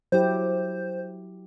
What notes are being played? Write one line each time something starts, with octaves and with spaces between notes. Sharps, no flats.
F#3 E4 G4 C5